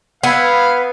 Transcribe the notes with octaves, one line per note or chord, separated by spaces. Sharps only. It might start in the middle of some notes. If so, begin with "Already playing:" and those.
B3 B4 F5 F#5 E6 G#6